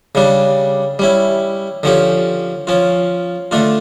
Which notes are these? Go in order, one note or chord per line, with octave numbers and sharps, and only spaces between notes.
C#3 G3 D4
G3 C#4 E4
D3 F3 C#4 G4
F3 C#4 F4
D3 A3 D4 F4